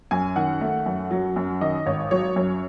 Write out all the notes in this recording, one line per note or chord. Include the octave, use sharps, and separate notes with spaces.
F#2 G#5
D#3 F#5
A3
F#2
F#3
F#2
D#3 D#5
G#1 C#5
F#3 C#5
F#2 C#5